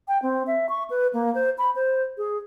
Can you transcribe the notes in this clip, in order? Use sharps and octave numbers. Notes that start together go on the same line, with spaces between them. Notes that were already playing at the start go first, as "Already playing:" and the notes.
G5
C4
E5
C#6
B4
A#3
C5
B5
C5
G#4